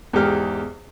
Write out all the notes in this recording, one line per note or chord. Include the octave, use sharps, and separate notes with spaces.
E2 G#2 G4 F6